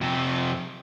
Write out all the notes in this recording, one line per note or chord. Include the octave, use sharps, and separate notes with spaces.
F2 C3